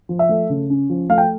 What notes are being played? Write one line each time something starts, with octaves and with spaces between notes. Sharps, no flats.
F3
E5
A3
C#3
C#4
F3
A3 F5
G5